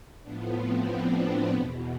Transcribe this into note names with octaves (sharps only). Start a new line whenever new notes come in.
A2 F3 B3 D4
C4
B3 D4
E2 B2 B3